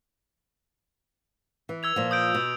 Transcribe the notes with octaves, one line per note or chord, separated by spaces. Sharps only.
E3
E6 G#6 F7
A#2 F3
D#6 G6 D7
B2